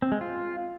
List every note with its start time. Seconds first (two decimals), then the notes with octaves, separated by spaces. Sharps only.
0.02 C4
0.12 G#3
0.21 F4